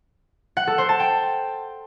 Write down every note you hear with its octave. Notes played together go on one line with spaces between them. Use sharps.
F#5
A4
C5
A5
G5